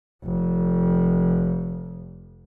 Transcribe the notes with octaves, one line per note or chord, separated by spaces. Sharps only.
F1 F2